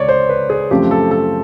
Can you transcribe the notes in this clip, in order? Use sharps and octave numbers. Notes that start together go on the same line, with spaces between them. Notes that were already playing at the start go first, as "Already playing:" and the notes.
Already playing: C#2 C#5 D5
C5
B4
G#4
F#2 C#3 F3 A3 C4 G4
A4
A4